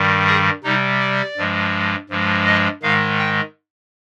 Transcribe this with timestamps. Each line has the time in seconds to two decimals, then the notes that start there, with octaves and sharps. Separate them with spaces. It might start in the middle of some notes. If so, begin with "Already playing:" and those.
Already playing: G2 D#3 G3
0.27 G#4
0.63 C3 G3 D#4
1.00 D5
1.37 G2 F3 G#3
2.10 G2 F3 G#3
2.46 D#5
2.82 G#2 D#3 G#3 F5
3.19 G5